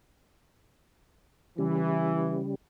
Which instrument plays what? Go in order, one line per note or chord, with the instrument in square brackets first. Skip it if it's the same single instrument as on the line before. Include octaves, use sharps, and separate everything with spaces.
[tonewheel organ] C#3 G3 [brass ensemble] E3